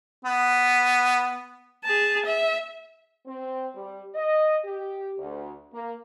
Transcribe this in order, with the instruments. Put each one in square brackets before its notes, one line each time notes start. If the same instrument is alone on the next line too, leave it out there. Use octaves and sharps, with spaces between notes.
[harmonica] B3
[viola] G#4 A5
E5
[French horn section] C4
G3
D#5
G4
D2
A#3